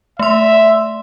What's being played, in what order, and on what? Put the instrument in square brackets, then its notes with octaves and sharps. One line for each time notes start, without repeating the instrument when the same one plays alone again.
[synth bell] A3 C6 [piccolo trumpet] E5